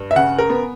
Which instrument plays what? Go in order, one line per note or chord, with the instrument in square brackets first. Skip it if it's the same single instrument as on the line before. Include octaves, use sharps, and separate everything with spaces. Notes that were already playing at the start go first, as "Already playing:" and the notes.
Already playing: [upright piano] G2
E5
C#3 F#5
A#4
B3